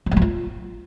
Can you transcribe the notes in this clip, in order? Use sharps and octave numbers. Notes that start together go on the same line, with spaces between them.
F3
G3
F#3
F4